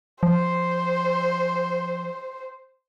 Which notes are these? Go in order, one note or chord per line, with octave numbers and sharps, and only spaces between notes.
F3 C5